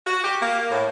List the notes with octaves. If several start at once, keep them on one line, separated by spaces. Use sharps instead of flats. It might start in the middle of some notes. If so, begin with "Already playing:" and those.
F#4
G4
A#3
A2